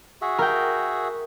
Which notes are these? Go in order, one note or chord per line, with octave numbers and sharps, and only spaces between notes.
F#4 G#4 E5
A#4 G5